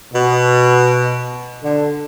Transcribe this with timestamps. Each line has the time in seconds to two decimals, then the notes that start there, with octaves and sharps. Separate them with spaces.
0.13 B2
1.63 D3